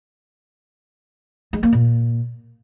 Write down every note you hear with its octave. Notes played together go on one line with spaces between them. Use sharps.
G#3
A#3
A#2